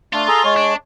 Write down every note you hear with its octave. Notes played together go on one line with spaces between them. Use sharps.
A3 D4 F4
G#4 A4 A#5
G#3 C#5
D4